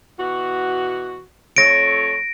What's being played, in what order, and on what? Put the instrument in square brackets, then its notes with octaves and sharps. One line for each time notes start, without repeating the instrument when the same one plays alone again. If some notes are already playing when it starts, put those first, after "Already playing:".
[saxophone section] B2 E3 F#4
[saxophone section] F2 A3 C#5 [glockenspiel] A#6 D7